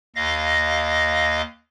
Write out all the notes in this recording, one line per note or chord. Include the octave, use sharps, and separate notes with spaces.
D#2 D#5 F5 A#6